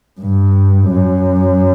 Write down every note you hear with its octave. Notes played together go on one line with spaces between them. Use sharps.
G2
F#2